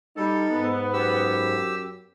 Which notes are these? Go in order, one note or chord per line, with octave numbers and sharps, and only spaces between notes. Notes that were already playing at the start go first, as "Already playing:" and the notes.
G3 D#4 A4
G#2 B3
F#2 G4 E6